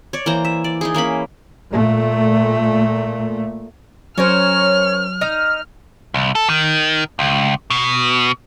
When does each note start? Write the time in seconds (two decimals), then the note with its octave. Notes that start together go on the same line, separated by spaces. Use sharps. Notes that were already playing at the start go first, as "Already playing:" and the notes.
0.13 C#5 D5
0.26 E3 A#3 C5 A#5
0.45 E5
0.64 D5
0.81 D#4 E4 G#4
0.94 E3 A#3 C#4 B5
1.72 A#2 A3
4.18 F#3 C#4 A#4 C5 C#5 F6
5.21 D#4 F6
6.14 C2
6.35 A4
6.49 D#3
7.19 C#2
7.70 B2